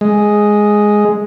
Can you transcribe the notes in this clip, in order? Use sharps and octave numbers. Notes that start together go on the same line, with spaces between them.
G#3